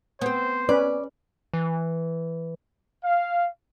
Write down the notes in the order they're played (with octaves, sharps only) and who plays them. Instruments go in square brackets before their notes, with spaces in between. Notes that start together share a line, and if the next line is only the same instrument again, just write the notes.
[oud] B3 C4 [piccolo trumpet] C5
[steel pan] C#4 B4 [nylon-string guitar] D5
[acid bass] E3
[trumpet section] F5